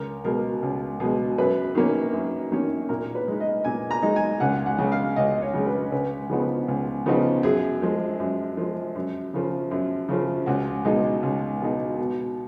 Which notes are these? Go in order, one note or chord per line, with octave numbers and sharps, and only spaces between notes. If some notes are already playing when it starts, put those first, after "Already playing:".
Already playing: C#2 A#4
B2 G#3 A#4
C#2
B2 G#3
F#2 B4
D#3 A#3 C#4
F#2
D#3 A#3 C#4
A#2 A#4
B4
G#3 D#4
D#5
A#2 G#5
A#5
G#3 D#4
G#5
C#2 F#5
F#5
C#3 G#3
F5
C#2 D#5
C#5
C#3 G#3
B4
C#2 B4
C#3 F3 B3 D#4
C#2
C#3 F3 B3 D#4
F#2 G#4
F3 G#3
F#2
F3 G#3
F#2
C#3 F3
F#2
C#3 F3
C#2 F#4
B2 G#3 D#4
C#2
B2 G#3 D#4
B2